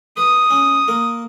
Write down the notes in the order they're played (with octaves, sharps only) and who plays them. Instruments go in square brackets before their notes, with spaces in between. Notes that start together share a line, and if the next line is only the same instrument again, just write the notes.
[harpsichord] B4 [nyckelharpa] D#6
[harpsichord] C#4
A#3 A#4